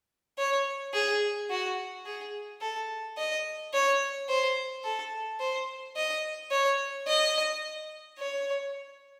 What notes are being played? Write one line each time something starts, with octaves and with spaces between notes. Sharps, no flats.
C#5
G#4
F#4
G#4
A4
D#5
C#5
C5
A4
C5
D#5
C#5
D#5
C#5